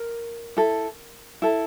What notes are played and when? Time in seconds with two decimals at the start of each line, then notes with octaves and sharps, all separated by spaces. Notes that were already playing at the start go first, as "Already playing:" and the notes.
Already playing: A#4
0.57 E4 A4
1.42 E4 A4